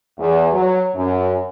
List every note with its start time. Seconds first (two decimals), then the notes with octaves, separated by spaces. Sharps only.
0.19 E2
0.51 F#3
0.95 F#2